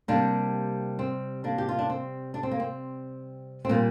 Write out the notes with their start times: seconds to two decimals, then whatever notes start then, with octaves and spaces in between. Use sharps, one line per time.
0.08 C3 G3 A#3 D4
0.99 C4
1.44 A#3 D4
1.58 G4
1.69 F4
1.79 D4
1.90 C4
2.34 D4
2.43 C4
2.52 A#3
2.60 C4
3.65 C4
3.69 A#2 G3 A#3